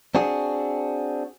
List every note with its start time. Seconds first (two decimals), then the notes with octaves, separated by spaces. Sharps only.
0.15 C4 D4 F#4 G#4